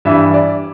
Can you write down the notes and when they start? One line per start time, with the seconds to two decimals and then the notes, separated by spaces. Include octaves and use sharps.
0.05 G2 E3 G3 E5
0.34 D5